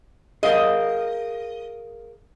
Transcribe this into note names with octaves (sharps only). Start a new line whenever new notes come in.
G#4 A#4 D#5 F5